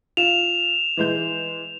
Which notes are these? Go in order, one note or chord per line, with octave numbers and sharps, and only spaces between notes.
F4 E7 F7
E3 G#3 G6